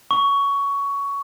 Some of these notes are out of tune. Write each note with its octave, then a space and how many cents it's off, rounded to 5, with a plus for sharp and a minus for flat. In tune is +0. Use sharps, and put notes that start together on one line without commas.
C#6 +15